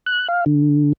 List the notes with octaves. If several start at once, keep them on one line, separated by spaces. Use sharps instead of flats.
F#6
F5
D3